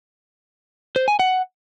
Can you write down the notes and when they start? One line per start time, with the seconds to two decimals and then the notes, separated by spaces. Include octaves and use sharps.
0.96 C5
1.08 G#5
1.19 F#5